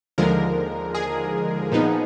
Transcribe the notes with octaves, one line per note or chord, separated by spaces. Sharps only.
D#2 D3 F3 G#3 A#4
G#4
A#2 F3 B3 D#4